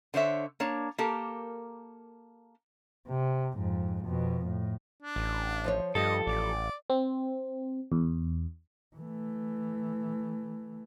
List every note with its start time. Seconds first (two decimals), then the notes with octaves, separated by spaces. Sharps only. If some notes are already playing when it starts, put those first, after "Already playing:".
0.14 D3 C5 C#5 E5
0.60 A#3 D4 C#5 A#5
0.98 A#3 G4 A4 A#4
3.08 C3
3.55 F2 G#2
4.04 F2 B2
4.47 A2
5.03 D4
5.16 A1
5.64 F3 C5 C#5
5.95 G2 F3 G4 A4 D#5
6.27 A1 D5
6.90 C4
7.92 E2
8.96 E3 A3